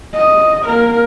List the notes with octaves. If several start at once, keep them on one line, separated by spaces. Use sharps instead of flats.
D#5
A#3 A#4